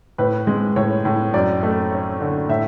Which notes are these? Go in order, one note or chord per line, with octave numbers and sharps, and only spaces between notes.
A2 B4
G#3
A2 C#5
A2
F#2 D5
A3
C#4
D3
A2 E5